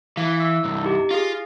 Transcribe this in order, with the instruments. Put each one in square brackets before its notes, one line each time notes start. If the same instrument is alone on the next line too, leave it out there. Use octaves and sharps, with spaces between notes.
[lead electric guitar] E3 [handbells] F5
[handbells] C#6 E6
[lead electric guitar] C2 G2
[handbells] D#4 G4
[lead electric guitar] F4 [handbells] G#4 F5 C#6